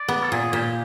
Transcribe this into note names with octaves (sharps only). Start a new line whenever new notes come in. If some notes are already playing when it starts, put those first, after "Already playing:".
Already playing: D5
B3
A4
A#2 G#4
A#2 G4